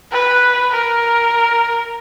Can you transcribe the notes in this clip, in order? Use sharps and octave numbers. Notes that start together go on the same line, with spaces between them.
B4
A#4